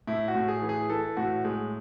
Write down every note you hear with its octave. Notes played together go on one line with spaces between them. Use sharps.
A2 E4
F#4
A2
G#4
E3
G#4
E3 A4
A2 F#4
A2 G#3